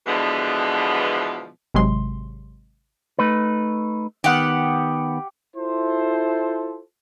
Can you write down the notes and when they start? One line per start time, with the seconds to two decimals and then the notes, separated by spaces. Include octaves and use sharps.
0.06 B2 D3 E3 F3 G#3 B3
1.74 G#1 C3 F#3 G#3 C6
3.19 A3 D#4 B4
4.24 D#3 B3 G4 F#5
5.57 E4 F4 A4 C5